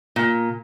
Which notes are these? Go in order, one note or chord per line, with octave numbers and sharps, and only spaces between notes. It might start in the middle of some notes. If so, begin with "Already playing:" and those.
A#2